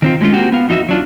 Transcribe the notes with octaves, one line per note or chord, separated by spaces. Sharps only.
D#3 C4 F4
F#3 G#3 A3 C#4 F4
A#3 C4 D#4 F#4 G4
B3 F5
F2 E3 D#4 F4 F#4 E5
F#3 D4 F4